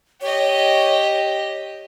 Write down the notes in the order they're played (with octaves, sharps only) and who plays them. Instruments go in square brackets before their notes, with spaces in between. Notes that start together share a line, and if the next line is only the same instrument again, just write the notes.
[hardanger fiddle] G4 D#5 [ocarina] C#5